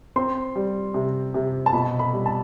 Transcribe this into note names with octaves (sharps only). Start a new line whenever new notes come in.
C4 C6
G3
C3
C3
A5
B2 B5
B5
G3
A5